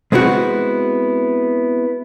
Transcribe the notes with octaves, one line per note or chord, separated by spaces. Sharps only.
G#3 B3 C4 E4 F#4